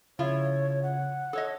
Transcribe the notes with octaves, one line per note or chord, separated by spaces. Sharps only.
C#3 F3 E4 F4 C#5
F#5
A4 C#5 D#5